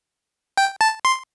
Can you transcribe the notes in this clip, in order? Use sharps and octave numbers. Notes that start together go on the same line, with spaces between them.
G5
A5
C6